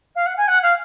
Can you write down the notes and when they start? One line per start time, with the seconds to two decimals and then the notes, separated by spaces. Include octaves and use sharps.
0.15 F5
0.26 F#5
0.37 G#5
0.47 F#5
0.62 F5